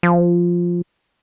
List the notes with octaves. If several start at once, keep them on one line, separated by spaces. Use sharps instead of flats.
F3